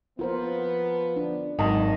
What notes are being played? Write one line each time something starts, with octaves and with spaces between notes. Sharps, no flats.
F3 B3 F4 A#4 C5
D4
G#1 D#3 F#3 D#5 A5